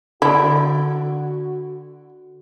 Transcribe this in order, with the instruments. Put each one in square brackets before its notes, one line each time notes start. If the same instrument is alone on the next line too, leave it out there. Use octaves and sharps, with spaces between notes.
[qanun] D3 G5 [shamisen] E4 [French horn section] F#4